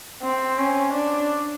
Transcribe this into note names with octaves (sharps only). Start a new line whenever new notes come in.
C4
C#4
D4